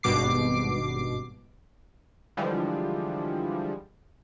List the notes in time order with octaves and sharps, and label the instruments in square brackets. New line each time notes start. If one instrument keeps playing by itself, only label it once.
[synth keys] G#1 G2 B2 D6 C7
[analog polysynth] D3 E3 F3 G3 G#3